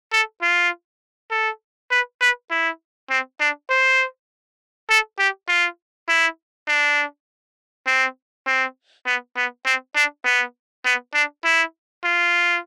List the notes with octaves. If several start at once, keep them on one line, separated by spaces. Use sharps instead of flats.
A4
F4
A4
B4
B4
E4
C4
D4
C5
A4
G4
F4
E4
D4
C4
C4
B3
B3
C4
D4
B3
B3
D4
E4
F4